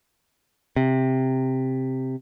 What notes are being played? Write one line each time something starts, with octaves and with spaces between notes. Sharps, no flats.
C3